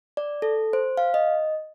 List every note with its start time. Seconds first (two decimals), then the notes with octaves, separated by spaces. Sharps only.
0.17 D5
0.42 A4
0.73 C5
0.97 F5
1.14 D#5